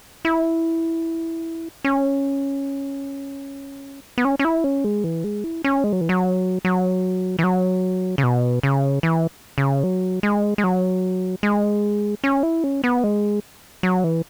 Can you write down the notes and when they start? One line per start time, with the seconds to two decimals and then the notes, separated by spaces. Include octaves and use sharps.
0.25 E4
1.84 C#4
4.18 B3
4.25 C#4
4.39 C#4
4.45 E4
4.64 C#4
4.84 G#3
5.04 E3
5.24 G#3
5.44 E4
5.64 C#4
5.84 G#3
5.93 F#3
6.01 E3
6.09 F#3
6.65 F#3
7.39 E3
7.44 F#3
8.18 C#3
8.23 B2
8.63 C#3
9.03 E3
9.58 C#3
9.84 F#3
10.23 G#3
10.58 G#3
10.64 F#3
11.43 G#3
12.24 C#4
12.43 E4
12.64 C#4
12.84 B3
13.04 G#3
13.83 F#3
14.04 E3